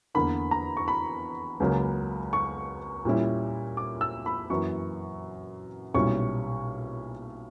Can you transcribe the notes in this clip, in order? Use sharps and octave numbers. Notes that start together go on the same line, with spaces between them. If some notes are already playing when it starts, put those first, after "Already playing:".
E2 D3 A#3 B5
A#5
C#6
B5
C#2 C#3 F#3 A#3
C#6
A#2 G3 C#4 E4
D6
E6
B5
F#2 E3 A#3 C#6
B1 A#2 G3 C#4 E4 C#6